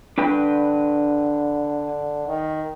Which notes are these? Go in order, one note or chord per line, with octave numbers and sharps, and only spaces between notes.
D3 D4 B4 G5
D#3